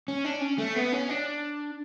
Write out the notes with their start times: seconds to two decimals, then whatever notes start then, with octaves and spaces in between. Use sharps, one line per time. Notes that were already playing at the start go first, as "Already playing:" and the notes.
0.08 C#4
0.25 D4
0.41 C#4
0.59 A3
0.76 B3
0.93 C#4
1.09 D4